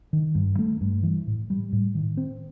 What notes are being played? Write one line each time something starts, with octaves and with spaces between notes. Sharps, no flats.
D#3
G2
A3
G2
E3
A2
G3
A2
D#3
C4